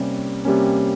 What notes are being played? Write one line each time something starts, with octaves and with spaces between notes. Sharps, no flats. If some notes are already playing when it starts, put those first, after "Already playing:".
Already playing: C3 G3 A#3 C#4
C3 G3 A#3 C#4